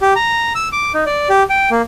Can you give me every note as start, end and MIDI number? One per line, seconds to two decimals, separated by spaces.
0.01 0.14 67
0.16 0.53 82
0.55 0.69 88
0.72 0.92 86
0.94 1.04 63
1.06 1.28 74
1.30 1.43 67
1.50 1.70 79
1.71 1.82 58